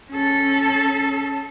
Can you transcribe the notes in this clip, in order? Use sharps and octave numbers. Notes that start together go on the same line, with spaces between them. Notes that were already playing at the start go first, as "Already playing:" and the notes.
C#4 A4